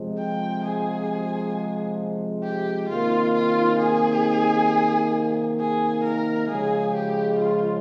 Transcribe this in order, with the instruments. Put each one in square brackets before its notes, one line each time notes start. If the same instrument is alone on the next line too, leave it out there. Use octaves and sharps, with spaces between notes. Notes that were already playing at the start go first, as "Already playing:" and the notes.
Already playing: [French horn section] C3 F3 G#3
[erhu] G5
G#4
G4
[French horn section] C3 D#3 A#3 [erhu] F4
[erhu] F4
G#4
G#4
A#4
[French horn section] C#3 F3 G#3 [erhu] G#4
[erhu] G4
F4